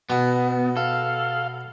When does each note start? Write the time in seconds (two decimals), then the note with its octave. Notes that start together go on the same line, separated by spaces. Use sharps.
0.10 B2 B3
0.77 A4 F5